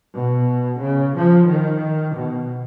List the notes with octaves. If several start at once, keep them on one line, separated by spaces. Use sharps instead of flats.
B2
C#3
F3
D#3
B2